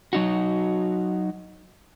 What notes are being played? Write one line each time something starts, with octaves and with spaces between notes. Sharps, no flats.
F#3 D#4 F#4